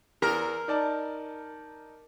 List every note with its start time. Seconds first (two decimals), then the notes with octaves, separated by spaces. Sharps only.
0.22 E2 A#4
0.68 D#4 D5 A5